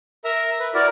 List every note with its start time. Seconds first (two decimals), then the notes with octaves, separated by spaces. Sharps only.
0.25 A#4 E5 A#5
0.60 B4
0.74 E4 F#4 A#4 D5